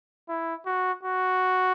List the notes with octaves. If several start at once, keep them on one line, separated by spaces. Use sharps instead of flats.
E4
F#4
F#4